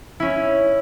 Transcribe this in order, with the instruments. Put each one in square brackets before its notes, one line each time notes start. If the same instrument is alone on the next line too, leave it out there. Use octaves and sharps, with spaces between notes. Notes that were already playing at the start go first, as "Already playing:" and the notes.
[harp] C#4 E4